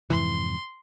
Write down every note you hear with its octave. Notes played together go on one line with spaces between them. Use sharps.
F2 G#2 C3 E3 C6